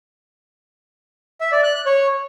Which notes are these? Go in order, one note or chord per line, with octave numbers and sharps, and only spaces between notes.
E5
D5
F#6
F#6
C#5